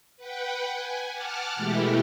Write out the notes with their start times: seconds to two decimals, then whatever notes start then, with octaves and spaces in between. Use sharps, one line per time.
0.17 B4 F#5 G5
0.71 G#5
1.11 F#5 A5 D6 F6
1.56 B2 E3 G#3 A3 E4 G4